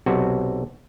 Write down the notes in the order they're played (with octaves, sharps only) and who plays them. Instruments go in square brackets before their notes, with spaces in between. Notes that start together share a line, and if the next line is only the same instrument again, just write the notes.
[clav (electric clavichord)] B1 C3 F#4